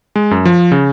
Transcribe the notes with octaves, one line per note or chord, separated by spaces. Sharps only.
G#3
F#2
F3
C#3